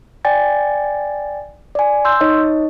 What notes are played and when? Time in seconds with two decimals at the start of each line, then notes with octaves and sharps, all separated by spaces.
0.25 D5 G5 G#5 A6
1.75 D5 G#5
2.05 C6 E6 G6
2.21 D#4 C#5 D#5